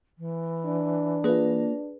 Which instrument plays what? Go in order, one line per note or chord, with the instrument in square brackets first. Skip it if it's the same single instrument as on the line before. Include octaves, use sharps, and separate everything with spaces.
[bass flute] E3
[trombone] D4
[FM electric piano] A#3 F4 [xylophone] G#4 B4